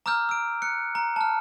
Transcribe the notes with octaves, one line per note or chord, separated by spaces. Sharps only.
A#5 D6 E6 F6 G6
E6 D7
F#6 C#7
A#5
A5 F6